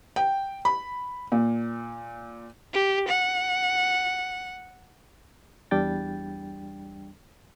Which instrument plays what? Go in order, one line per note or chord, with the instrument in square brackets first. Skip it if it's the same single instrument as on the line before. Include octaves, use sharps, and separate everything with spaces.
[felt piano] G5
B5
A#2
[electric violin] G4
F#5
[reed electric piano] E2 G3 D4 G5 A6